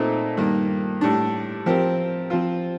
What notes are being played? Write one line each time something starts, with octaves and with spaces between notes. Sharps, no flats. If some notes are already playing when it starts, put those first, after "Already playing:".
Already playing: A#2 A3 C4 D#4 A4
G2 D#3 A#3
A2 G3 D4
F3 C4 G4 A#4
F3 C4 F4